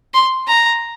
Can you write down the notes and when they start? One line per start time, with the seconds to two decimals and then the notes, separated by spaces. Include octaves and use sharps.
0.14 C6
0.48 A#5